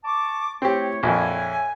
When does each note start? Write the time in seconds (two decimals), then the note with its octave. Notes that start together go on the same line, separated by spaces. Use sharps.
0.04 A5 C#6 D6
0.62 A3 C4 E4 G4 C#5
1.03 A#1 F2 C#5 E5 G#5